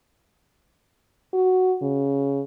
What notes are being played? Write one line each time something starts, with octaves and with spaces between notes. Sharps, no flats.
F#4
C#3